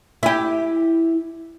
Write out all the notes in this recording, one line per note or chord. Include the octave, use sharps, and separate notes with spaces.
E4 G4